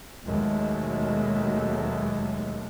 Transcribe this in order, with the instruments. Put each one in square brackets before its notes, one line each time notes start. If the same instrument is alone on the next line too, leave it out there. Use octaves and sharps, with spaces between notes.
[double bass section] D#2 B2 F#3 G#3 A3